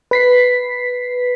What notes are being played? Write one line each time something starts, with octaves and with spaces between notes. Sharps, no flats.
B4 B6 C7